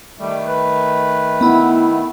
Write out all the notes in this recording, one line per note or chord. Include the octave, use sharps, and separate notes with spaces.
D#3 G3 A3
B4
B3 E4